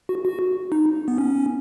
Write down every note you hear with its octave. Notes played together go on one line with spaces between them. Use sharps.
F#4
F#4
D#4
B3
C#4